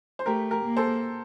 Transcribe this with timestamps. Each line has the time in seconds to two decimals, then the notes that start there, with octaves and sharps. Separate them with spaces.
0.19 C5
0.26 A3 G4 A#4
0.51 G4 A#4
0.64 A#3
0.77 A4 C5